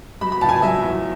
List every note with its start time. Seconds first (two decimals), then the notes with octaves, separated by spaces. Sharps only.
0.21 F#3 B5
0.32 B5
0.41 C#2 A5
0.49 G#5
0.62 F#3 E5
0.83 E2